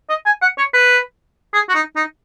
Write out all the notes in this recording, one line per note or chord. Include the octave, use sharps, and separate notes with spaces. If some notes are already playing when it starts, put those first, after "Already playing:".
D#5
G#5
F#5
C#5
B4
G#4
F#4
D#4
D#4